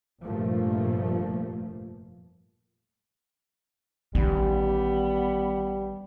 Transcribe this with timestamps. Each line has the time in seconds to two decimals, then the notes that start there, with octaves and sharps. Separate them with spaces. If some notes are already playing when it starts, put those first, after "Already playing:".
0.23 F1 G2 A#2 F3 A3 A#3
4.15 A1 D#3 G3 B3